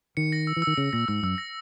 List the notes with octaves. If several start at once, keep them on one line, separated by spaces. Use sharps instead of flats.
D#3 C#7
A#6
E6
E3
E6
D#3
C#3 C#7
A#2 A#6
G#2 E6
F#2 E6
A#6